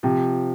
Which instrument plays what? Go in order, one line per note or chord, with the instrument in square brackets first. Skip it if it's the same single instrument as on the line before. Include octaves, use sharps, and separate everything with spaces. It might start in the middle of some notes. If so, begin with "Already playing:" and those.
[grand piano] C3 [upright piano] F3